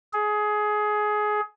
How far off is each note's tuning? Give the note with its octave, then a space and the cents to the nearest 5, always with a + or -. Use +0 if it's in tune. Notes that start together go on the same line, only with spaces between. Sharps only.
G#4 +20